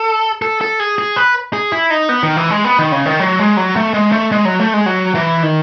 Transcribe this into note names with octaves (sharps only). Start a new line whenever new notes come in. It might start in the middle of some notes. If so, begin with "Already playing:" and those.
Already playing: A4
A4
A4
G#4
G#4
B4
G#4
E4
D#4
B3
D#3
E3
G#3
B3
D#3
C#3
D#3
F#3
G#3
F#3
A3
G#3
A3
G#3
F#3
A3
G#3
F#3
E3
D#3